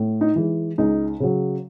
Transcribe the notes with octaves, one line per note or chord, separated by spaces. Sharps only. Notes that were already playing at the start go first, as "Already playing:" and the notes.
Already playing: A2
D#4
E3 G#3
C#2 D#4
C#3 F#3